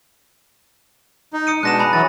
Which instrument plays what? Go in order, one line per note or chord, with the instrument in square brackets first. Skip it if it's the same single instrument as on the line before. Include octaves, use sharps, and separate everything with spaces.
[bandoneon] D#4
[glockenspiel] D#6 C#7 D#7
[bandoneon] B2 G#3 D4 [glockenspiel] F#6 A#6 E7
[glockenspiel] G#5 A#5 B5
[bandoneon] E3 F#3 [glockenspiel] A6